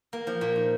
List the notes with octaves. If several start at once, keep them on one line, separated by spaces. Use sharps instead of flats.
A#3
F3
A#2
D#4